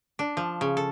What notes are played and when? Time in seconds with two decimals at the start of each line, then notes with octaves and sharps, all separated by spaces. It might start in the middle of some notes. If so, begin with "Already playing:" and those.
0.19 D4
0.37 F3
0.61 C#3
0.77 A4